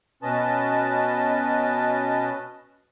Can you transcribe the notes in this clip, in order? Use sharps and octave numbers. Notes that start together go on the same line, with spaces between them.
B2 C#4 B4 D#5 A5